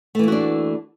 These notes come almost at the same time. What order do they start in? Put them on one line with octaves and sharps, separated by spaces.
A3 E3 A#3 F#4 D4